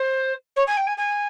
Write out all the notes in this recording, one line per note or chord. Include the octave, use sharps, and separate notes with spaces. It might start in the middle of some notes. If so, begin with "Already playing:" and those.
Already playing: C5
C#5
G#5
G5
G#5
G#5